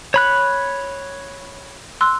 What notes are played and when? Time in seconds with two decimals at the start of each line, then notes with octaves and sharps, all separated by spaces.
0.14 C#5 B5 F#6
2.01 C6 E6 F#6